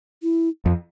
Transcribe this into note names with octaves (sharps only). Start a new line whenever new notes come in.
E4
F2